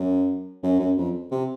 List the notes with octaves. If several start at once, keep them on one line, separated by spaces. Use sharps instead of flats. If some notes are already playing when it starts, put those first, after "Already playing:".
Already playing: F#2
F#2
F#2
F2
C3